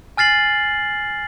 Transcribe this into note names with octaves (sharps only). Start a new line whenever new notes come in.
G#5 F6 A6 C7 F#7